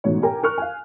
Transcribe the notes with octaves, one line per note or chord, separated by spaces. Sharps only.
A1 G#2 B2 C#5
G4 A#4 G5 G#5 A#5
A#4 C#6 F6 F#6
F5 G#5